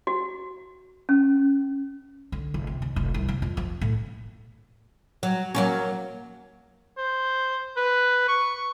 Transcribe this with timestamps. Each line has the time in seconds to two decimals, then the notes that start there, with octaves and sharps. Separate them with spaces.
0.07 F#4
1.09 C#4
2.32 D3
2.54 F1
2.67 C3
2.82 D#2
2.96 F1
3.14 C2
3.29 D4
3.42 F2
3.57 F3
3.81 A2
5.23 F#3
5.55 F#3 A#3 C#4
6.98 C5
7.77 B4
8.28 C#6